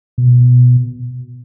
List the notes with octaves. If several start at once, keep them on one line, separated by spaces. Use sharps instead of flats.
B2